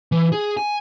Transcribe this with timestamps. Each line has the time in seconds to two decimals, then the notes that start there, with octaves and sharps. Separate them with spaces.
0.12 E3
0.32 G#4
0.57 G#5